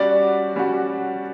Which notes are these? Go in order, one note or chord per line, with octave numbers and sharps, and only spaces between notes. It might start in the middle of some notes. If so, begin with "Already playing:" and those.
Already playing: G3 C#4 F#4 D5
G3 C#4 F#4